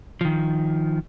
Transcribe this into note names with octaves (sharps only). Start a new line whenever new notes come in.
D#3 F3